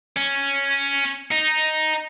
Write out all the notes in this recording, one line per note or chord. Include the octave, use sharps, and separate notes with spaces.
C#4
D#4